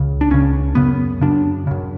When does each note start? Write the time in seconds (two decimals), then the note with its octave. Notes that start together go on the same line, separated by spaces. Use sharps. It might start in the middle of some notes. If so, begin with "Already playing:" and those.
Already playing: C#2 C#3
0.21 D4
0.31 C#2 C#3 C#4
0.75 F#2 C#3 B3
1.21 F#2 C#3 D4
1.67 F#2 C#3